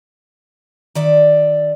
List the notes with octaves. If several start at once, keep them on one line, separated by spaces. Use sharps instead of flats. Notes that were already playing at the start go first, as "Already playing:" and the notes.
D#3 D5 E5